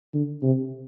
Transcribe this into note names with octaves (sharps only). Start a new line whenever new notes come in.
D3
C3